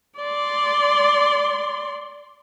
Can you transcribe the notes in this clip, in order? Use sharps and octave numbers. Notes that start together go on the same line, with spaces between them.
D5 C6